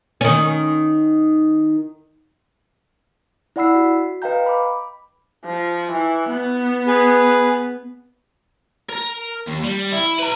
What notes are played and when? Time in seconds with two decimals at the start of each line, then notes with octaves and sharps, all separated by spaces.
0.21 D#3 C#4
3.56 E4 D5 F#5 B5 E6 C7
3.75 F#4
4.22 B4 D#5 F5 G5 A#5 G6
4.46 B5 D6
5.46 F3
5.92 E3
6.30 B3
6.87 G#4 B4
8.90 A#4
9.48 D#2
9.64 G3
9.92 E4
10.19 B4 A#5